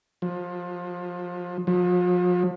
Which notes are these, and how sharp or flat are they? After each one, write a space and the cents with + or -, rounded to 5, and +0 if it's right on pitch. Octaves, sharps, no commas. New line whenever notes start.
F3 +25
F3 +40